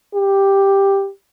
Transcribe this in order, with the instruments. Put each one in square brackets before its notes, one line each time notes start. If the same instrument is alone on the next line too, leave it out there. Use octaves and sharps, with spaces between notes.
[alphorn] G4